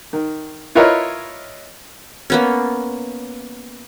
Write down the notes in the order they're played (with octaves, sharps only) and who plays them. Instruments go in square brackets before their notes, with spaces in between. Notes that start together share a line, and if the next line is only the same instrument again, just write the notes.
[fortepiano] D#3
E4 F4 A#4 B4 C#5 D#5
[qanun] A#3 B3 C#4